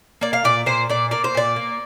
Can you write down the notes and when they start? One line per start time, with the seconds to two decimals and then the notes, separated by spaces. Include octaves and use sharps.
0.21 A#3 D5
0.33 F5
0.44 A#2 D5
0.66 A#2 C5
0.90 A#2 D5
1.11 A#3 D5
1.24 C5
1.35 A#2 D5
1.56 A#3